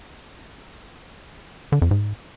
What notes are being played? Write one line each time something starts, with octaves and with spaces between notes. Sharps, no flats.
D3
F2
G#2